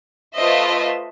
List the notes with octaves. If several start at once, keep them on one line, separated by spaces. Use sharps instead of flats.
A3 F4 B4 C5 D#5 E5